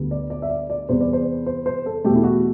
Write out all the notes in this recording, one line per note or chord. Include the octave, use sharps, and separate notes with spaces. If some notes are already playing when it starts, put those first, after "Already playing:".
Already playing: D2 D3 G3 B3
D5
D5
E5
D5
D5
E2 C3 G3 B3 C5
D5
C5
C5
C5
A4
E2 B2 A3 G4
E4
F#4